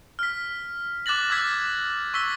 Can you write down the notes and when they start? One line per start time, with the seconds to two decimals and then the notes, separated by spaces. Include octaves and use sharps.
0.19 F6 B6
1.06 D6 F#6 A6 A#6 F#7
1.30 D6 E6 F#6 G#6 B6 F#7
2.14 C#6 E6 B6 G7